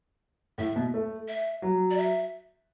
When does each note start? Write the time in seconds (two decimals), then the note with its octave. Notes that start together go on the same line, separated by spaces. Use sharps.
0.58 A2 E5
0.76 B2
0.94 A3
1.28 E5
1.62 F#3
1.90 D5
1.97 E5